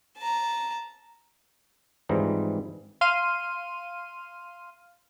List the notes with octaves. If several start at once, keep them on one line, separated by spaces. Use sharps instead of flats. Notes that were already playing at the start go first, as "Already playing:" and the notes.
A5 A#5
G#2 E3 F3 G3 C4 A#5
F5 C6 F6 D#7